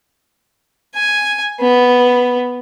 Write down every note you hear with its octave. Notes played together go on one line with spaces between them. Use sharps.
G#5
B3